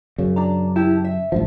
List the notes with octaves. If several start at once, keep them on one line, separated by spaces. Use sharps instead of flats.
F#2 C#3
D4 A#5
E4 G4 A5
E5
A1 G2 F3